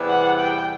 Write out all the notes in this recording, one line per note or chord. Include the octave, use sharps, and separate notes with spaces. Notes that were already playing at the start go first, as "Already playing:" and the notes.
Already playing: E2 C3 E3 G3 B3
F#5
G5